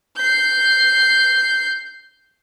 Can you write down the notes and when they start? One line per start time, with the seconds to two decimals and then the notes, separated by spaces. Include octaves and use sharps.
0.17 G6 C7